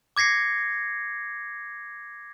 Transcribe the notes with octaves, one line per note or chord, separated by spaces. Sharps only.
D6 G#6 A#6 C7 C#7